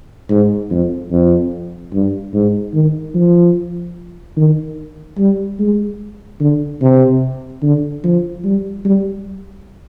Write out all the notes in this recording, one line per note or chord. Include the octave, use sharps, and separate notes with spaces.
G#2
F2
F2
G2
G#2
D#3
F3
D#3
G3
G#3
D3
C3
D3
F3
G3
G3